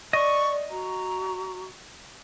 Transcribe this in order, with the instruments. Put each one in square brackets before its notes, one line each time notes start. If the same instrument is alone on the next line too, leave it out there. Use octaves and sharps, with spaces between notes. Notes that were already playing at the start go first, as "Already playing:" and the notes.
[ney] D5 [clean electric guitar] D#5 [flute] C#6
[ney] F#4 [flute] A#5